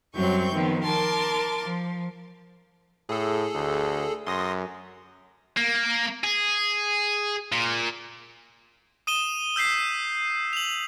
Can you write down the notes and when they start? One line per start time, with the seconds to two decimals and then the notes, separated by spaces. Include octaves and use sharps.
0.14 F#2 F#3 G3 C4 C#6 G6
0.53 D#3 F3 B3 C4
0.82 A#4 A5 C6 D6
1.61 F3
3.09 A2 G#4 A4
3.55 D2
4.27 F#2 C6 D#6 A#6
5.57 A#3
6.24 G#4
7.52 A#2
9.07 D#6 D#7 E7 G7
9.56 E6 G6 B6 C7 G7
10.53 F7 F#7